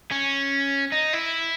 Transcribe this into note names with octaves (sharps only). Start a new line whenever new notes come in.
C#4
D#4
E4